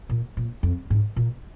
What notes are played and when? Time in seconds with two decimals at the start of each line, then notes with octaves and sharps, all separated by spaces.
0.09 A#2
0.37 A#2
0.63 F2
0.90 G#2
1.16 A#2